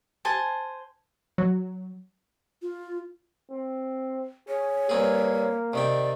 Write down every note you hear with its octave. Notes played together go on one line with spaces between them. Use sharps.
C5 G#5 A5
F#3
F4
C4
G#4 C#5
G2 A#3 C4 G#4
C3 D#3 D5 G5